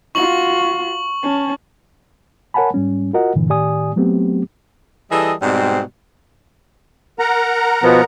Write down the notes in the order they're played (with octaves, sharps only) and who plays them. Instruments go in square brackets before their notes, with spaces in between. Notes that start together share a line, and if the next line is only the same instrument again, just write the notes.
[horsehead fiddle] F4 F#4 [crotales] C#6 F#7
[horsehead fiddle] C#4 A5
[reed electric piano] A#4 C#5 F#5 G#5 A5 B5
G#2 G3 C#4
F4 F#4 A#4 D#5 F#5
G2 A#2 D3 E3
A2 D#3 G4 D5 G#5 D#6
F#3 A3 B3 C4 G4
[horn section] E3 G3 G#4 A4 D#5
G#2 B2 G3 C4
[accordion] A#4 F#5 A#5
[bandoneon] B2 F3 B3